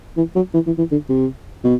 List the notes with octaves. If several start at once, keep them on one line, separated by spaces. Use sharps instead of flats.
E3
F#3
E3
E3
E3
D3
C3
B2